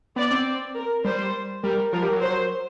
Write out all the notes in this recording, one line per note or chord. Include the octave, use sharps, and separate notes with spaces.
B3 D5
C4
A#4
G3 C5
G3 A#4
F3 A#4
G3
F#3
C5